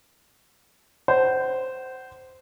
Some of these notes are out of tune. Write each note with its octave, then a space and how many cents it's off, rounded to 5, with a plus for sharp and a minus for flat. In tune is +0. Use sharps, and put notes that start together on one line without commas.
C5 -10 F#5 +30